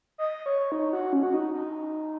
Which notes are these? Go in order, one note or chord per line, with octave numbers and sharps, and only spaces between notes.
D#5
C#5
D#4
F#4
C#4
F#4
D#4
D#4